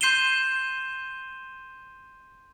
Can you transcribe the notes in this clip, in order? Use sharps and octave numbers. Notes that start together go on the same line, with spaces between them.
C6 G6 C7 D#7 E7 G7